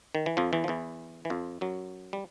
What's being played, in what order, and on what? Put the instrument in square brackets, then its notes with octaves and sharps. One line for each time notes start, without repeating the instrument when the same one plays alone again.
[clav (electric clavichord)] D#3
E3
F2 F3
E2 E3
F3
E2 E3
E3
F2 F3
F#2 F#3
G3